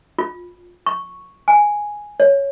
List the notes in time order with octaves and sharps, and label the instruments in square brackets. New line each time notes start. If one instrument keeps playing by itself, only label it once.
[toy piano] F4
C#6
G#5
C#5